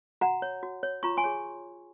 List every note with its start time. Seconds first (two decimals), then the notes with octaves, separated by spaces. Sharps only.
0.21 F#4 F#5 A#5
0.42 C#5
0.63 F#4
0.83 C#5
1.03 F4 A#5 C#6
1.17 G#5 C6
1.24 G#4 C#5